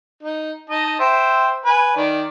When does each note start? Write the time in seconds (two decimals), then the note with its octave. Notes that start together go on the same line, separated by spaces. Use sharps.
0.23 D#4
0.70 D#4 D#5 A5
1.00 C5 E5 G5
1.65 B4 G#5
1.97 D#3 D5